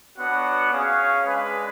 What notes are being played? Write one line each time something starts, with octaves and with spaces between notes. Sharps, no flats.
B3 D4 F#4 C#5 F#5
C#4 G#4 C#5 F5
G#3 D4 G#4 B4